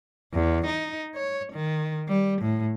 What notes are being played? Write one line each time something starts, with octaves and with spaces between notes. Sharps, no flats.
E2
D#4
C#5
D#3
G3
A2